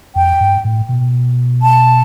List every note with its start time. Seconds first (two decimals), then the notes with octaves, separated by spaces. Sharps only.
0.15 F2 G5
0.40 G2
0.64 A2
0.89 B2
1.62 A5